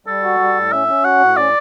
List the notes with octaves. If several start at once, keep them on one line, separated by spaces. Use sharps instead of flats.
G3 A4
F#4
G3
A2
C#4 E5
C#4
F#4 F#5
A2
C#4 D5